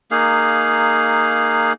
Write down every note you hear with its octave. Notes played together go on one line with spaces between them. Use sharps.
A#3 D#4 G#4 F5